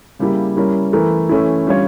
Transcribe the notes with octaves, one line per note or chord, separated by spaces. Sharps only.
C#3 G3 A#3 E4 G4
G3 C#4 E4 A#4
E3 A3 E4 A#4
E3 A3 C#4 E4
D3 G3 C#4 F4 C#5